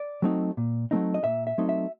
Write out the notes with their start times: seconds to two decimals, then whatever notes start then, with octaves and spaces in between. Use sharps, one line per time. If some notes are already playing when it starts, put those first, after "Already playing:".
Already playing: D5
0.22 F#3 A3 C4 D#4
0.57 A#2
0.91 F#3 A3 C4 D#4
1.14 D#5
1.24 A#2 E5
1.47 E5
1.58 F#3 A3 C4 D#4
1.69 E5